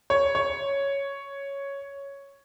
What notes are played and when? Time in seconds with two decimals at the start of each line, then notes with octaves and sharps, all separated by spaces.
0.10 C#5
0.35 C#5